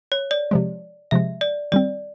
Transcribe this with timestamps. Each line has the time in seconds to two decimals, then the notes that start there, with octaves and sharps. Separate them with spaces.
0.12 C#5
0.31 D5
0.51 C3 F3 G#3
1.11 C3 F3 G#3 E5
1.41 D5
1.72 D#3 G3 C4 D5